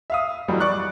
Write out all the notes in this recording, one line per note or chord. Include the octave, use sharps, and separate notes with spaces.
E5 F5 D#6
F2 G#2 E3 F#3 G3
D5 C#6 F#6